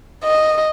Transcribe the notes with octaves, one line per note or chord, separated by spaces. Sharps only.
D#5